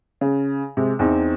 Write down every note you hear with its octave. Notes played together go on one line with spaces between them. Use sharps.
C#3
C3 G#3
E2 C4 D#4